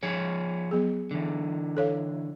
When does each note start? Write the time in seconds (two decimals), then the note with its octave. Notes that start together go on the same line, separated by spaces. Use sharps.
0.03 F3 G#4 C#5
0.71 F#3 B3 G#4
1.11 D3 E3
1.77 A4 C#5 F5